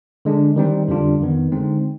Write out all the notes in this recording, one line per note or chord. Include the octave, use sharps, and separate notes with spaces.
D3 G#3 D4
D#3 G3 C4 D#4
F2 D3 G3 D4 F4
F2 D#3 B3
D3 G#3 C4 D#4